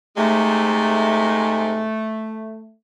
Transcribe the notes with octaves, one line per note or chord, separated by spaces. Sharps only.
G#2 C3 G#3 A3